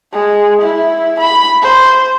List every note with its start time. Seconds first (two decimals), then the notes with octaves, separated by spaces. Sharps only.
0.12 G#3
0.61 E4
1.20 B5
1.62 C5